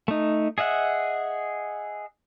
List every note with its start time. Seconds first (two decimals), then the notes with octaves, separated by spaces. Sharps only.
0.08 A3 D#4
0.58 G#4 D#5 E5 F#5